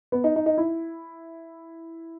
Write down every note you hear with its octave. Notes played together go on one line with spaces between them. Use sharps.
B3
D#4
D#4
D#4
E4